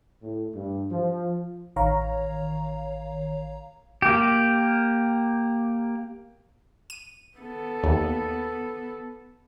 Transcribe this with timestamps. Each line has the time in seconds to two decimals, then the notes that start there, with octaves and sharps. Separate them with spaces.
0.21 A2
0.54 G2
0.90 F3
1.76 A1 D#3 C#5 F5 A#5
4.02 A#3 G4
6.90 D#7
7.38 B3 A4
7.84 D#2